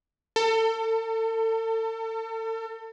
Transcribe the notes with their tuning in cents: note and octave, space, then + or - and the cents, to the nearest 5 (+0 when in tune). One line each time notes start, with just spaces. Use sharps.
A4 +35